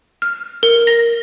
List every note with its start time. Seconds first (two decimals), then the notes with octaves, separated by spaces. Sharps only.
0.22 F6
0.63 A#4
0.87 A#6